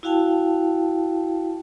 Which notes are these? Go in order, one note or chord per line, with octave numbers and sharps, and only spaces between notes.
E4 F#4 F5 G5 A5